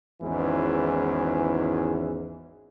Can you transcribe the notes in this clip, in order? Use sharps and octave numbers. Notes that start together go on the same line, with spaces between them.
G#1 E2 G#2 E3 C#4